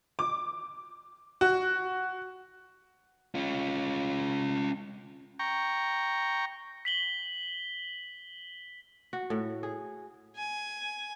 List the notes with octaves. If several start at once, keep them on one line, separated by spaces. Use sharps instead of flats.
D6
F#4
C#4 F4
G5 A#5 C#6
B6 F#7 G7
F#4
A2
G#4
G#5